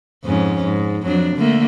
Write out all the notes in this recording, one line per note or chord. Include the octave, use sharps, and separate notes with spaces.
F2 G#2 C#4
G#2
F2 F#3 D4
D3 A3 A#3